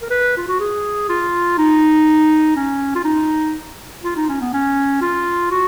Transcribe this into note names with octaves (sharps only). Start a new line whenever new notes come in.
A#4
B4
F4
F#4
G#4
F4
D#4
C#4
F4
D#4
F4
D#4
C#4
B3
C#4
F4
F#4